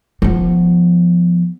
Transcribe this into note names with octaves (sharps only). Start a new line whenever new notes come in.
F3 B3